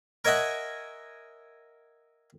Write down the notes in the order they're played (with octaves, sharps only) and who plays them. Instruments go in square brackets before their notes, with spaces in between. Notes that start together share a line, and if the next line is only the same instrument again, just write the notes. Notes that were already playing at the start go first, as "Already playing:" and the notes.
[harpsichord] A#4 C#5 D#5 E5 F#5 G#5